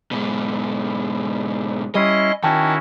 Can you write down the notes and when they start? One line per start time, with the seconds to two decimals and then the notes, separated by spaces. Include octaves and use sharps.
0.11 G#2 B2
1.95 G3 C#4 E4 D#5 C6
2.43 D#3 C#4 E4 F#4 G5 A5 C#6